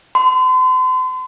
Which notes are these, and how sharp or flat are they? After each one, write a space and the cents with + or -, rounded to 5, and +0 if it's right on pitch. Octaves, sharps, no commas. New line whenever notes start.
C6 -40